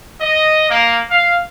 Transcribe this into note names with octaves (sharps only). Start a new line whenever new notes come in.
D#5
A#3
F5